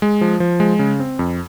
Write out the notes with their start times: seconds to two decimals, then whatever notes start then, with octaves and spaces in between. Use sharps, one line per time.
0.02 G#3
0.21 F3
0.40 F3
0.60 G#3
0.79 C#3
0.99 C4
1.19 F2